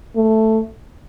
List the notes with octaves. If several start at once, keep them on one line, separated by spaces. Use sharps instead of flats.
A3